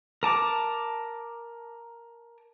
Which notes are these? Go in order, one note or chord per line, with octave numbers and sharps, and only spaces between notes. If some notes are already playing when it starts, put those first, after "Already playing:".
A#4 A5 D6